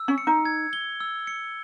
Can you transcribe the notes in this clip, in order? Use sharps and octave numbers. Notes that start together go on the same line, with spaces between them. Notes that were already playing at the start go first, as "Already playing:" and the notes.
Already playing: E6
C#4
C#7
D#4
G#6
G7
E6
C#7